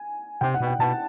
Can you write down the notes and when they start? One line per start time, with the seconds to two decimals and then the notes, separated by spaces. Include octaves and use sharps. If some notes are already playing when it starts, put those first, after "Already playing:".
Already playing: G#5
0.41 C3 G5
0.54 F#5
0.60 B2
0.67 G5
0.79 B2 A5